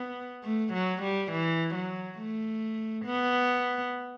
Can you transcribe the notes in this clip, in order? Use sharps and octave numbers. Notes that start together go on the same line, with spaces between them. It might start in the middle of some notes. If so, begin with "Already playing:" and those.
Already playing: B3
A3
F#3
G3
E3
F#3
A3
B3